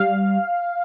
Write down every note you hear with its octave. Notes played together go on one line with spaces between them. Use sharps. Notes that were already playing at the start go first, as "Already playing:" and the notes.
Already playing: G3 F5